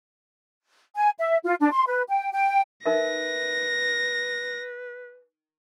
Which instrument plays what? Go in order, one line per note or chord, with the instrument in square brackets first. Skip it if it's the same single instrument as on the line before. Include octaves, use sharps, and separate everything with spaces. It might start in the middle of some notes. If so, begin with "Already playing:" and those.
[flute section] G#5
E5
F4
D4
C6
B4
G5
G5
[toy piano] D#4 A#4 E5 [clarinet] B4 [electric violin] A#6